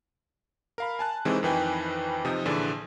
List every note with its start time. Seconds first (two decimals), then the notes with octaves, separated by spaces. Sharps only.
0.78 A#4 F5 B5
0.99 G#5 A5 F#6
1.25 C3 D#3 E3 G#3 C4
1.43 F2 D#3 E3 B4 G5 G#5
2.25 C3 F3 D#4 D#6
2.45 A#1 D3 E3 G#4 B4 D5